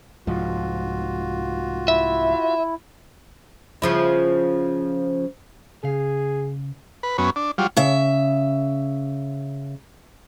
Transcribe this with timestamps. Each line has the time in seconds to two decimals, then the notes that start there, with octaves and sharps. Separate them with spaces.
0.27 C2 G#2 F3 F4 F#4
1.88 E4 E5
3.82 C#3 F3 E4
5.84 C#3 G#4 F5
7.03 B4
7.18 F#2 B3 C#4
7.36 D4
7.58 F#3 G3 F4
7.77 C#3 E5